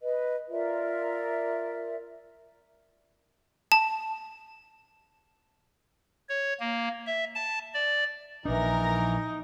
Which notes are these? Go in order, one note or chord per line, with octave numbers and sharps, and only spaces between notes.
B4 D#5
F4 A#4 D5 E5
A5
C#5
A#3
E5
A5
D5
A#1 E3 D4 D#4 A#4 A#6